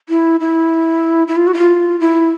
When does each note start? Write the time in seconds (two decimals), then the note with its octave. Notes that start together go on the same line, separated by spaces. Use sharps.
0.09 E4
0.40 E4
1.28 E4
1.36 F4
1.47 F#4
1.54 E4
1.58 F4
2.00 E4